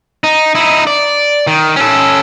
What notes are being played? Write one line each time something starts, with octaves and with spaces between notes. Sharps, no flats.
D#4
D#4 E4
D5
D#3
C#4 A4